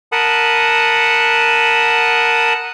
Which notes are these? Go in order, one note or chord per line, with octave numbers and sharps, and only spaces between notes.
A#4 F#5 A5 B5 D#6